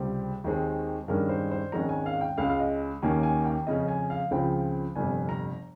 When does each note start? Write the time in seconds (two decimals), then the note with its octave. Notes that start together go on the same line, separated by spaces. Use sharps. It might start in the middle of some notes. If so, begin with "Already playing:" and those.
Already playing: C#2 C3 G3 C4
0.44 D#2 D#3 G#3 C4
1.08 G2 D#3 G#3 C#4 A#4
1.29 C5
1.51 C5
1.72 G#1 G#2 D#3 G#3 C#4 A#5
1.89 G#5
2.06 F5
2.21 G5
2.37 C#2 C#3 G#3 C#4 F5
2.49 F5
2.60 D#5
3.02 D#2 D#3 A#3 C#4 G#5
3.23 G#5
3.45 G5
3.67 F2 C#3 G#3 C#4 D#5
3.88 G#5
4.10 F5
4.31 C#2 C#3 F3 C4 G5
4.95 G1 F2 C3 G#5
5.29 A#5